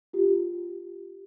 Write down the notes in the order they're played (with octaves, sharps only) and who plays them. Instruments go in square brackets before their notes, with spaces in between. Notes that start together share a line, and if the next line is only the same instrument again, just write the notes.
[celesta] F4 G4